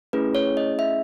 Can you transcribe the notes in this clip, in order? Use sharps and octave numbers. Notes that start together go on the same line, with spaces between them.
A3 C#4 E4 G#4 B4
C#5
D#5
E5